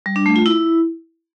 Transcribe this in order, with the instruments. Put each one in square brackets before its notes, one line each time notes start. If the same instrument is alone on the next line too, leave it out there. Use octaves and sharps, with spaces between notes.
[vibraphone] G3
D4
A3
F4
E4